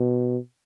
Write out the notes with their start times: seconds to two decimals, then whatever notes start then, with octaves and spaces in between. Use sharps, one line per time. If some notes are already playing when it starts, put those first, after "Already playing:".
Already playing: B2